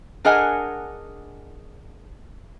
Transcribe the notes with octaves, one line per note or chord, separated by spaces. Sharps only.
D4 G#4 A#4 D#5 F#5 G#5